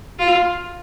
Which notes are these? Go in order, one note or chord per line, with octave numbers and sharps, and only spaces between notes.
F4